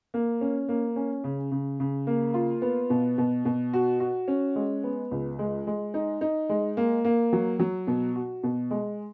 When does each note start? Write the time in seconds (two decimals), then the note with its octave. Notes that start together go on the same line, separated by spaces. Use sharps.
0.14 A#3
0.41 C#4
0.69 A#3
0.96 C#4
1.24 C#3
1.51 C#3
1.80 C#3
2.07 A#3
2.34 F4
2.62 B3
2.90 B2
3.18 B2
3.45 B2
3.73 F#4
4.00 F#4
4.28 C#4
4.56 G#3
4.84 B3
5.11 C#2
5.39 G#3
5.67 G#3
5.94 D#4
6.21 D#4
6.49 G#3
6.77 A#3
7.05 A#3
7.33 F#3
7.59 F#3
7.87 B2
8.16 F#4
8.43 B2
8.71 G#3